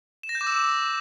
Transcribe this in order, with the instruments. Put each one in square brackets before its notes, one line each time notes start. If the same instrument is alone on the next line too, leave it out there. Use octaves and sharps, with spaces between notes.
[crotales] E7
A#6
G6
D6
E6